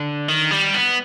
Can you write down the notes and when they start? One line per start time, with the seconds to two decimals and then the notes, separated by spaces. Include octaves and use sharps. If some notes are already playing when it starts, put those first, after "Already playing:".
Already playing: D3
0.28 D#3
0.51 G3
0.74 B3